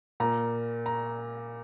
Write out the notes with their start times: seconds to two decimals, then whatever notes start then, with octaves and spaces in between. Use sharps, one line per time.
0.20 A#2 A#3 A#5
0.86 A#5